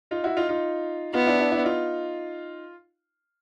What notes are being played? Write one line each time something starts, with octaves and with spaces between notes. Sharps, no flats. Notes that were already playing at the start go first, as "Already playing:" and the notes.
D#4 F4
E4 F#4
D#4 F4
D#4 F4
B3 D#4 F4
D4 E4
D4 E4
D4 E4
D#4 F4